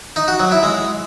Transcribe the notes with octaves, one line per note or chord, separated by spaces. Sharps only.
D#4
F#4
F#3
E4
G#3